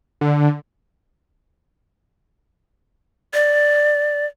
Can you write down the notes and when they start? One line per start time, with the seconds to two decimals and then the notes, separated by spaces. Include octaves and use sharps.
0.21 D3
3.34 D5